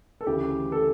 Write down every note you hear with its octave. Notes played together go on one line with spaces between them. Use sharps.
A4
D2 C#3 E3 G4
A4